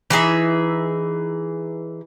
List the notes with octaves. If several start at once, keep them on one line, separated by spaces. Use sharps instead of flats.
E3 D#4 G#4 E5